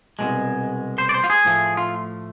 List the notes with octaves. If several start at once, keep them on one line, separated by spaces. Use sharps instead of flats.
C2 B2 G#3
C5
D5
C5
F4
G#4
A2 F3 A3
F4